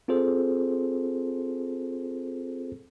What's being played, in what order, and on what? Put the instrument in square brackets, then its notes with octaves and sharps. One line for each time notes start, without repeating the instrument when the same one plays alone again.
[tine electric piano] C4 F4 G#4 A4 C5